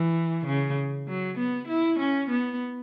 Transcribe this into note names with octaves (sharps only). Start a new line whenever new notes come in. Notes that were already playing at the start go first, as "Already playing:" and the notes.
Already playing: E3
C#3
F#3
B3
E4
C#4
B3